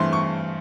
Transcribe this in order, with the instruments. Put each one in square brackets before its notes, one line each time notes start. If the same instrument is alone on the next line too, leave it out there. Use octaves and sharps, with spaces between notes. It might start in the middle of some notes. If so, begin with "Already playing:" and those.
Already playing: [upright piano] G2 E3 A3 C4 C6
C#6